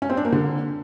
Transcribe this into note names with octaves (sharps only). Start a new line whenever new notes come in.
C#4
C4
D4
A#3
D3